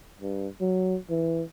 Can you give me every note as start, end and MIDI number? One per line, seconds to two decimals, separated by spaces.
0.21 0.48 43
0.61 0.97 54
1.10 1.43 52